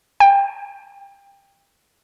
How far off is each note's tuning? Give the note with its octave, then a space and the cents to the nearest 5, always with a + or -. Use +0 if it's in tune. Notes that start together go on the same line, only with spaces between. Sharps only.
G5 +25